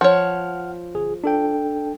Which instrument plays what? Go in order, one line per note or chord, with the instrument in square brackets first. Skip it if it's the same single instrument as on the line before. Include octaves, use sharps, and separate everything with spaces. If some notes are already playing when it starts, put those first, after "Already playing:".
[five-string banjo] F3 C#5 [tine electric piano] F#5 F6
[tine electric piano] G1 G#4
D4 A4 G5